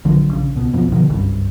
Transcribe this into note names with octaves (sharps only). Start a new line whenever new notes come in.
A#1 D3 F#3
A#1 C#3
C#2 B2
F#1 B1 F2 B2
B2 D3 D#3 F3
F#1 C2 G2